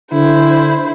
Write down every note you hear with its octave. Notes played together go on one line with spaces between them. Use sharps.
D3 E4 C5